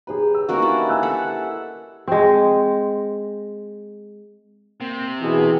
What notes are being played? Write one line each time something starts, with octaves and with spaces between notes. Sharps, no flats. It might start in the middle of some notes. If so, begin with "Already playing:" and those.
G4 G#4 B4 C#5 A#5
E6
D#3 A#3 C#4 F#4 A#4
D4 E4 A5
G#5 E6 F#6
A4 E5 F#5
G#3 C4
C3 A#3
B2 E3 G#4